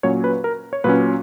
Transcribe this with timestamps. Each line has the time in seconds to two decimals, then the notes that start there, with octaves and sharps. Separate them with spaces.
0.03 A#2 F#3 C#4 C#5
0.24 B4
0.44 A#4
0.73 C#5
0.84 A#2 F#3 C#4 B4